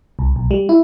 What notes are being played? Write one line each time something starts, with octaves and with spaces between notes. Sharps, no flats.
C2
B1
G3
E4